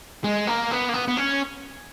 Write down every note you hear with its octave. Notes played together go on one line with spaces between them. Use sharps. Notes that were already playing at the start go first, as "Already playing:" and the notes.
G#3
A#3
B3
A#3
B3
B3
C#4